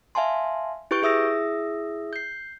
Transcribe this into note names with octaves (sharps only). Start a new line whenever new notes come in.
E5 F5 G#5 A5 C6
E4 G4 B4 C#6 G6 D7
E4 G#4 E5 D#6 E6 A#6
G6 C7